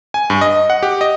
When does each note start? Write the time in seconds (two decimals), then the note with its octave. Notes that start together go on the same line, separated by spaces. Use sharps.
0.14 G#5
0.30 G2
0.41 D#5
0.70 F#5
0.83 G4
1.01 D#5